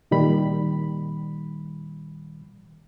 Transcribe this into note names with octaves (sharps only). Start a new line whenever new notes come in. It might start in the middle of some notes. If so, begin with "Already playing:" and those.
A#2 D#3 G3 B5